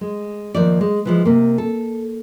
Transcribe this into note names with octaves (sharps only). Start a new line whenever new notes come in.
G#3
D#2 F3 D5
G#3
E3 F3 G#3
C3 A#3
A4